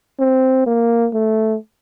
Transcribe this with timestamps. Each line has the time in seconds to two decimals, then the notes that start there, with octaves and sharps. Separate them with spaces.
0.20 C4
0.66 A#3
1.14 A3